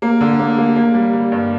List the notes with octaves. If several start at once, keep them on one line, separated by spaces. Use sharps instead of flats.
A#3
D3
A#3
A#3
A#3
G3
G3
G2